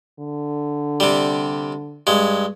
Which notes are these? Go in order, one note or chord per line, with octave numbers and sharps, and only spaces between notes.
D3
C3 G3
G2 G#3